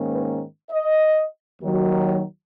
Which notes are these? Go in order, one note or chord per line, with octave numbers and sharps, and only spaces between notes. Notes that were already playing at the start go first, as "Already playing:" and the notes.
Already playing: G#2 D#3 A#3 C#4
B4
D#5
D#2 D#3 F#3